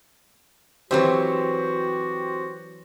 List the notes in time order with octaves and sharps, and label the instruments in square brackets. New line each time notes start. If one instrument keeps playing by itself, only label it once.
[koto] E3 F#3 E5 [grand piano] C4 G4 C5 [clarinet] F#4